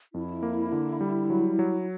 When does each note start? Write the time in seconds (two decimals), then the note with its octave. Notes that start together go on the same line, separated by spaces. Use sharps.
0.14 F2 E4
0.43 A#3
0.72 D3
1.01 G3
1.30 F#3
1.59 F#3